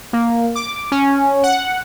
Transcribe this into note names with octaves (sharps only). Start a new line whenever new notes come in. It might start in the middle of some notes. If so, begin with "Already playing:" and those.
A#3
D6
C#4
F#5